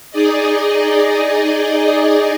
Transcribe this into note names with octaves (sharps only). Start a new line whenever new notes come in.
D#4 G#4 D5 D#5